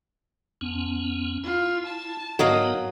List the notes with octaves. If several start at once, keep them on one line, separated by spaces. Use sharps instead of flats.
F2 B3 C#4
E4 F4
A5
G#2 F#3 B3 D#4 A#4 D#5 F5